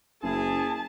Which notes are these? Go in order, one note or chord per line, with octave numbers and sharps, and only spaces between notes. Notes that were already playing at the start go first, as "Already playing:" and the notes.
F#1 E4 G#4 A5